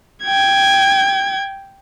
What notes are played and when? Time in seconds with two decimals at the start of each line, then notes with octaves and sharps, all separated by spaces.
0.24 G5 G#6